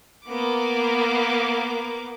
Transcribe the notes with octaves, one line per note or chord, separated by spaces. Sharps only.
A#3 B3 D6